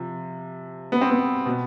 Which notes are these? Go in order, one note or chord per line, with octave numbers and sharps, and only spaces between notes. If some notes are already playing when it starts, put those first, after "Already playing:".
Already playing: C3 F3
B3
C4
B3
B2